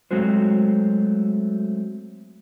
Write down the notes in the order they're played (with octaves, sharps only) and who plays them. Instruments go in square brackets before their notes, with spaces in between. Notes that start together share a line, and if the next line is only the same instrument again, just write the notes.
[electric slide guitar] F#3 G#3 A3 C4 F#4 C5